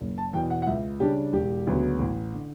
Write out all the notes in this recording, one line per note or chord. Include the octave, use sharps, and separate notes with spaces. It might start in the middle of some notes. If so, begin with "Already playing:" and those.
F#1
A5
E2 B2 G5
F#5
F#5
C#2 E5
C#3 G3 D4 G4
E1 G4
D2 C#3 F#3 B3
A1
D3